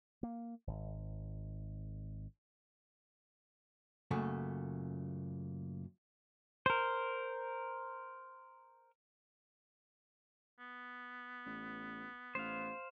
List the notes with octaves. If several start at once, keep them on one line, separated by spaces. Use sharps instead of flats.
A#3
G#1
F#2 A#2 C#3 A3
A#4 C5
B3
A1
A1 C5 F5